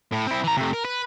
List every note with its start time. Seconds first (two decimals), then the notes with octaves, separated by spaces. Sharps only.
0.12 A2
0.27 C4 E4
0.44 E3 A#5
0.57 C3 A3
0.73 A#4
0.85 B4